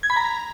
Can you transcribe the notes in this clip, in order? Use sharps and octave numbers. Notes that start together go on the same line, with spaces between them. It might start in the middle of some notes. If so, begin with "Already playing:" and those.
G#6
B5
A#5